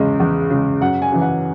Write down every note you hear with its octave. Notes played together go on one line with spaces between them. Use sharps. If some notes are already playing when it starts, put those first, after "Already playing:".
Already playing: E2 C#3 G#3
E2
C#3 G#3
F#2 F#5
G#5
C#3 E3
F#5